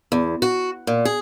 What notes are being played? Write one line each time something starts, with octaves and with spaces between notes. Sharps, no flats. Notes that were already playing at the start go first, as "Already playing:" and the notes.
E2
F#4
A#2
G#4